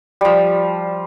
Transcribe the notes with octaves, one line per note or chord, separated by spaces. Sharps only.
F3 G3